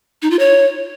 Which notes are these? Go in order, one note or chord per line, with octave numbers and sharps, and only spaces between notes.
D#4
F4
C#5